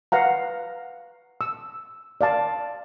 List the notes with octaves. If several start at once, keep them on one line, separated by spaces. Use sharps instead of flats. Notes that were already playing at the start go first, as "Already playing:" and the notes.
B4 F5 F#5 A#5
E6
D5 F5 A5